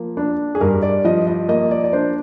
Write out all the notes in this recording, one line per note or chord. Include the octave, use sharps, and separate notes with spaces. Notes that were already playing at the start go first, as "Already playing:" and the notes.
Already playing: F3 A#3
D4
G#4
G2 A#4
D5
F3 D#5
D#5
A#3 D#5
D5
D5
D4 C5